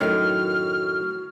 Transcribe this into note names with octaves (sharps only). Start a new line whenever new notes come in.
F#2 A2 D#3 F#4 F6